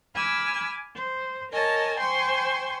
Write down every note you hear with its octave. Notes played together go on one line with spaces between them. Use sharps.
G#5 B5 D6 E6 F6
C5
A#4 C#5 D#5 G#5 A5
C5 G5 G#5 C6 C#6